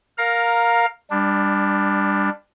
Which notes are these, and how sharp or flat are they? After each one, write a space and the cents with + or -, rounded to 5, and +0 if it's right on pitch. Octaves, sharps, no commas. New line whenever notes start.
A#4 +0 F5 +15 A#5 +0
G3 +25 D4 +0